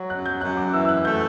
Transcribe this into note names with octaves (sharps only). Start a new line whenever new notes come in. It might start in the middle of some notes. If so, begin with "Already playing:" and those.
Already playing: F#3
F#2 F#6
G6
F#2 F#6
D6
E3 E6
E6
F#6
A3 G6